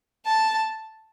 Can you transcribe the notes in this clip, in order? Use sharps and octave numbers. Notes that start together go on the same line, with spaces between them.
A5